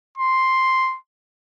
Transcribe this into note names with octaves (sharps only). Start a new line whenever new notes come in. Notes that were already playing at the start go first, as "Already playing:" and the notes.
C6